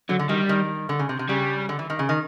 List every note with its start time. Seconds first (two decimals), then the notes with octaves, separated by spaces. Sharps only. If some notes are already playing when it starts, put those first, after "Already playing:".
0.09 D3 F#3
0.19 D3
0.29 D#3 G3
0.49 D#3
0.89 D3
0.99 C#3
1.09 C3
1.19 C3
1.29 C#3 G3
1.69 D3
1.79 E3
1.90 D#3
1.99 C#3
2.09 D#3